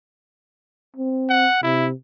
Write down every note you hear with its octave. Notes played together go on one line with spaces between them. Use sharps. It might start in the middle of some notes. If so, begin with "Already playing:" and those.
C4
F#5
C3 E4